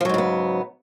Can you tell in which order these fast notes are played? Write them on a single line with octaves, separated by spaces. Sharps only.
F3 F#3 G#2 C#3 B3